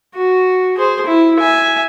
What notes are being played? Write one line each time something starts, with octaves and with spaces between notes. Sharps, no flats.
F#4
G#4 C5
E4
E5 G#5